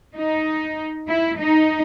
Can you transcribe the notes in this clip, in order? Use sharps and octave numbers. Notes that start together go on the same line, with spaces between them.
D#4
E4
D#4